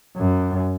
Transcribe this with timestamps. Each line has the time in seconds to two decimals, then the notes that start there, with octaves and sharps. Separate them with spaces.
0.17 F#2